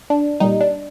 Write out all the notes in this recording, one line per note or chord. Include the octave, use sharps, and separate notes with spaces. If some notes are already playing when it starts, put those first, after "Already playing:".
D4
A#2 G3 D#4
D4